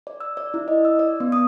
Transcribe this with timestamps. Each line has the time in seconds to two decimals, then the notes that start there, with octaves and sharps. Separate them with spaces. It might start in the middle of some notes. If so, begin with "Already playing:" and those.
0.07 D5
0.20 E6
0.37 D5
0.54 E4
0.68 D#5
0.85 E6
0.99 D5
1.20 B3
1.32 D#6